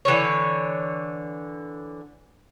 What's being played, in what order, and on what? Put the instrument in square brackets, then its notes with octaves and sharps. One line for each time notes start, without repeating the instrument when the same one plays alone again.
[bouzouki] D3 E3 C#4 C#5